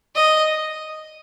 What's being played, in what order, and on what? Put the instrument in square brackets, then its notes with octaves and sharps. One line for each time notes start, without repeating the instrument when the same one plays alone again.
[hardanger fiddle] D#5